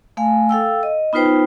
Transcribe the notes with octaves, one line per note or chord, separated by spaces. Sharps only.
A3 F5 G#5
A4 F5 G5 E6
D#5
B3 D#4 F4 B4 C5 G5